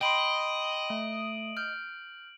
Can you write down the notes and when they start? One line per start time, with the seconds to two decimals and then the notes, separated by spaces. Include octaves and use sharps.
0.01 D#5 G5 B5 C6 D7 F#7
0.90 A3
1.57 F6 G6